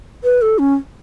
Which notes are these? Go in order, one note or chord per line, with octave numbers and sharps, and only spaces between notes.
B4
A4
C#4